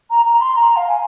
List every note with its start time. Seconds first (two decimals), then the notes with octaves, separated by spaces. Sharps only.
0.10 A#5
0.25 A#5
0.40 C6
0.56 A#5
0.76 F5
0.87 G#5